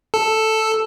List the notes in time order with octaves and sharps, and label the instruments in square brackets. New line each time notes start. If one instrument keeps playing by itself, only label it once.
[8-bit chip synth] A4